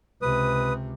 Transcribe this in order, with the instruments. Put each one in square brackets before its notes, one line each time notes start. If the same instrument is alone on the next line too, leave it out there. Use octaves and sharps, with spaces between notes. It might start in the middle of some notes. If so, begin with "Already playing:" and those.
[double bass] C#2 C3 [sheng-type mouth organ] B4 D#6